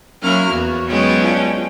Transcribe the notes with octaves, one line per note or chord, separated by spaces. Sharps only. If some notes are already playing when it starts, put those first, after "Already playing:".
F#3 A#3 C#4 E4 F#4 C#5 F6
E2 B3
F#3 G#3 B3 C#4 G5
D4 F4